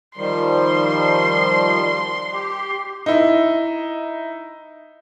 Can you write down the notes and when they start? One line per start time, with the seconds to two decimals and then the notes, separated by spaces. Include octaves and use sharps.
0.17 D#3 F3 G3 C6
2.33 G4
3.06 D#4 E4